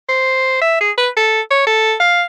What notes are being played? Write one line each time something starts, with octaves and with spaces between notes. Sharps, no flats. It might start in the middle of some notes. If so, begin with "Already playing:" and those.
C5
E5
G#4
B4
A4
C#5
A4
F5